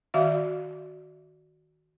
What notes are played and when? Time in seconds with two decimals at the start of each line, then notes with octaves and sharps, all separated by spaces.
0.14 D#3 F#4 E5 F5